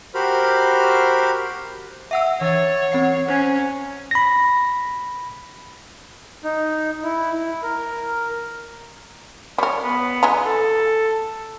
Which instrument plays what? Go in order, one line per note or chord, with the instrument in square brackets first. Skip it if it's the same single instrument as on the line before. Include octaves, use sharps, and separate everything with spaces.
[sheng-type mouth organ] F#4 G4 A#4 C5 B5 F6
[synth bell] E5 F#5 E6
[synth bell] E3 F#5 A6 [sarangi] C#5
[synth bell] C4 F#5 C7
[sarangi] C#4 [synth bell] C5 G#6
[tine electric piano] B5 A#6
[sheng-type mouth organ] D#4
E4
E4
A#4
[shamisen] G3 A#4 [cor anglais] C#5
[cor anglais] B3
[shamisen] E3 G#3 A#5
[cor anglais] A4